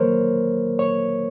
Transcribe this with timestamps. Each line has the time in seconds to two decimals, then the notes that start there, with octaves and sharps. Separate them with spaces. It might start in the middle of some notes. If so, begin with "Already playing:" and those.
Already playing: D#3 F#3 A#3 A#4 C5 C#5
0.79 C#5